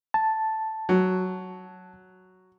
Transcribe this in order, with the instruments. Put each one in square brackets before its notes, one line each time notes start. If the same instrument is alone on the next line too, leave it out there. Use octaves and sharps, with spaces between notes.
[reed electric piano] A5
[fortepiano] F#3